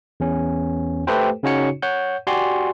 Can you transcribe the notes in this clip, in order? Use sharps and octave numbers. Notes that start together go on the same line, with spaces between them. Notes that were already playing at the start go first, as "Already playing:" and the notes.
E2 C#4
A3 G4 A4 B4 C5 G5
C#3 C#4 D#4 F#4 C#5 C#7
C#5 F#5 G6
F#4 G4 D5 G#5 C6